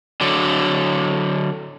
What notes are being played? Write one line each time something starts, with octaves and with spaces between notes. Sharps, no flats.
D3 F#3